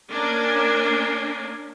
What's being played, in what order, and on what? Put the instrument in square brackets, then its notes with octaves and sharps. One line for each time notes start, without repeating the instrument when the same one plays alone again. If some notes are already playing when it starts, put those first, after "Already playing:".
[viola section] A#3 C#4 D4 A#4 G#5